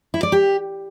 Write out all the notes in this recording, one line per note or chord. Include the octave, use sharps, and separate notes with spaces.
E4
D5
G4